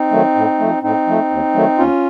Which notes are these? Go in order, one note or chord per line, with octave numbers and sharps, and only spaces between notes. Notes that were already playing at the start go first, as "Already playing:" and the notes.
Already playing: C4 D#4
D#3 F#3 A3
A2
F3 A3
A2 C4 D#4
F3 A3
D#2
D#3 F#3 A3
D#2 C#4 F4